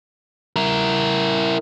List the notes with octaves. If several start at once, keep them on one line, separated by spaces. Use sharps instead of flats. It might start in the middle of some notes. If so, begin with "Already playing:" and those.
E4 A#4